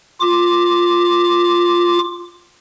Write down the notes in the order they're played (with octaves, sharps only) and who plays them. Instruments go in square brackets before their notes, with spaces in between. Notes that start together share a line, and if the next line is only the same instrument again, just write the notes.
[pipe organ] F4 D6